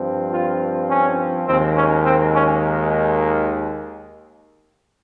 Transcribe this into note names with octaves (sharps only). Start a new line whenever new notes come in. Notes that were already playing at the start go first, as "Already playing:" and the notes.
Already playing: G2 F3 C4
F4
C#4
D#2 D#3 G#3 C4
C#4
C4
C#4